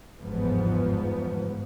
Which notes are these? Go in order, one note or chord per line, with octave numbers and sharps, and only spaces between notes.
G1 E2 G#2 F3 B3